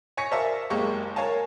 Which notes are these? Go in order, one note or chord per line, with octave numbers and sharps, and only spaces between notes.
C#5 G#5 C#6 A#6 B6 C#7
A#4 C5 D5 E5 F5 A5
F#1 G#3 A#3 G4 C#6
A#4 C#5 F5 G#5 A5